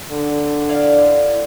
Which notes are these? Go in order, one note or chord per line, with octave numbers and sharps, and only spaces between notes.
D3
E4 D5 F5